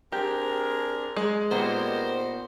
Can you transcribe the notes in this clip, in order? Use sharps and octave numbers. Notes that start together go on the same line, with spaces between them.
C4 D4 G4 G#4 A#4
G#3
A#2 B3 C4 D#4 G4 A#4 C5